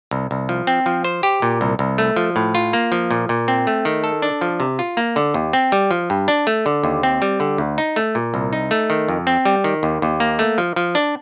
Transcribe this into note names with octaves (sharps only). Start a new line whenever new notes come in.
C2
C2
F3
C4
F3
C5
G4
A#2
C2
C2
A3
F3
A2
F4
A#3
F3
A#2
A#2
C4
A3
D#3
A4
D4
F3
C3
F4
A#3
D3
D#2
C4
G3
F3
G2
D4
A3
D3
D#2
C4
G3
D3
D2
D#4
A3
A#2
C2
D#4
A3
D#3
F2
C4
G3
D#3
D#2
D#2
A#3
A3
F3
F3
D4